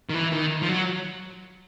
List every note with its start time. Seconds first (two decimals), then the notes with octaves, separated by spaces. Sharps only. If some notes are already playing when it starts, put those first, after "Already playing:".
0.10 D#3
0.14 E3
0.32 D#3
0.62 F3
0.69 F#3